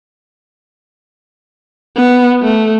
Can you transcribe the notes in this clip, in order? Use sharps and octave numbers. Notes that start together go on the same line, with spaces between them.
B3
A3